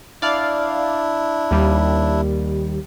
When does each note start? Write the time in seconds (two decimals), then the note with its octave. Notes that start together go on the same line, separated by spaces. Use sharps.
0.22 D4 E4 D5 F5
1.51 D#2 G3